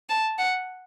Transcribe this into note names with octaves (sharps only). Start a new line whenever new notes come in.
A5
F#5